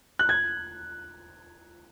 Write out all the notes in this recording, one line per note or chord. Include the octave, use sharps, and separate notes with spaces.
F#6
G#6